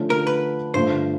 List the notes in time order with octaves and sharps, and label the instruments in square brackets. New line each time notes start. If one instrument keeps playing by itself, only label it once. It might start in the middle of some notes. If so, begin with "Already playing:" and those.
Already playing: [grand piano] D3 F3 A3 C#4 F4
[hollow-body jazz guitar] A#4
B4
[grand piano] G2 D3 F3 A3 [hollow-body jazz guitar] C5